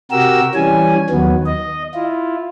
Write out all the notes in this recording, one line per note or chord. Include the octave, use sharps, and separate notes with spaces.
C3 F#4 G4 A#4 E6
E3 G3 C#4 G#5
D#2 D#3 F#3 B3
D#5
E4 F4